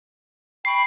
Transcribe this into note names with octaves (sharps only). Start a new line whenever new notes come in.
G5 B5 C#6 C7